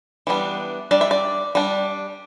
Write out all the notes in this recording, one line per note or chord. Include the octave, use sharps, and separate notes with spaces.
E3 G3 B3 D4
G3 D4 D5
E5
D5
G3 D4